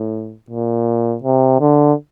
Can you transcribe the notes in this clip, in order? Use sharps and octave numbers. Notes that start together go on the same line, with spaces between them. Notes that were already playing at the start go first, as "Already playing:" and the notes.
Already playing: A2
A#2
C3
D3